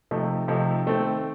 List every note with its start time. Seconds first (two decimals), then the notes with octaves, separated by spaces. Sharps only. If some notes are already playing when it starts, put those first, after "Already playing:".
0.11 C3 F3 A3 D#4
0.48 C3 F3 A3 D#4
0.86 D#3 A3 C4